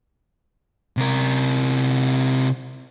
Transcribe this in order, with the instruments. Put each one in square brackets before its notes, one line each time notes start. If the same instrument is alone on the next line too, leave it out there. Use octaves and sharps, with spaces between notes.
[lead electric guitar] C3 A#4